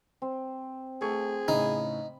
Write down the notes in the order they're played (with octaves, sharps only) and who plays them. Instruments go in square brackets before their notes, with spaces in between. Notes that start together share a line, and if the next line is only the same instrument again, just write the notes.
[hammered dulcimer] C4
[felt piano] A3 C#6 [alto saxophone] G#4
[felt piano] A2 C#3 [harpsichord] D#4 [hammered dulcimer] B5